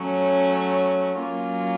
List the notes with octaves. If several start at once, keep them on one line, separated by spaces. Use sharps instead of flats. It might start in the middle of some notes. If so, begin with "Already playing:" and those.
Already playing: F#3 A3 C#4
F#3 A#3 C#4 F4